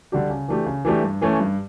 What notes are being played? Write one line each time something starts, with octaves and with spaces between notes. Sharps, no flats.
D3 G3 D4 G4
C#3
E3 A3 D4 G4
C#3
E3 A3 D4 G4
G2
E3 A3 C#4
G2